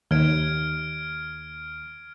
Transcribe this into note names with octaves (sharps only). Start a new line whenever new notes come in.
D#2 F6 G#6 D7